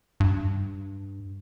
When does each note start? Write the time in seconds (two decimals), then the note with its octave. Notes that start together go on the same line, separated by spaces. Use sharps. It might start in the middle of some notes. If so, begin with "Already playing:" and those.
0.20 G2